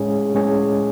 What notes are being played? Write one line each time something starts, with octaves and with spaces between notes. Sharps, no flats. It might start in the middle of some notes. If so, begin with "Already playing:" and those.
Already playing: A2 G#3 C#4 G#4 C#5
A2 G#3 C#4 G#4 C#5